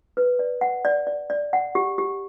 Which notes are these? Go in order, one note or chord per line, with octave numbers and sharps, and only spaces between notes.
B4
D5
F#5
D5
D5
D5
F#5
G4
G4